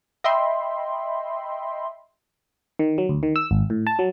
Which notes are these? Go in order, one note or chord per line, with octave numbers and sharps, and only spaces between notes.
D#5 E5 G5 B5 C6
D#3
F#3
D2
D#3
E6
G#1
A2
A5
F#3